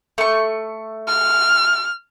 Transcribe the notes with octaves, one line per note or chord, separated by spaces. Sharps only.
A3 C#6
F6